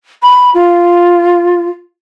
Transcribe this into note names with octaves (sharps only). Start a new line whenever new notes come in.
B5
F4